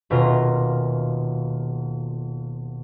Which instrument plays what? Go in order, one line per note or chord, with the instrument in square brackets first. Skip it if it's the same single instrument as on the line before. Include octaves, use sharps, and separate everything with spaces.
[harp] D#1 B2 F4 A#4